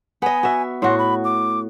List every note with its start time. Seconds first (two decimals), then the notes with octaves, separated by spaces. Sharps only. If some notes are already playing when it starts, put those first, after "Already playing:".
0.22 B3 D#5 G#5
0.43 F#4 E5
0.82 A2 F#4 C6
0.99 B5
1.24 D6